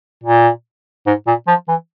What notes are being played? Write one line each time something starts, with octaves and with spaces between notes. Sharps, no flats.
A#2
G#2
A#2
F3
E3